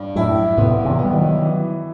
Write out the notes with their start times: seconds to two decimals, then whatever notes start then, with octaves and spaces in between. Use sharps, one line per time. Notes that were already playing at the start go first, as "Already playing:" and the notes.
Already playing: G2
0.15 F#2 A2 E4
0.57 A2 C3 B3
0.85 C3 E3
0.99 G3 B3
1.13 D#3 F#3
1.41 E3